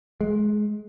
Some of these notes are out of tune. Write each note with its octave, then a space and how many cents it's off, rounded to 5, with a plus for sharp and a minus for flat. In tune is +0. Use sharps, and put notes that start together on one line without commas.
G#3 +20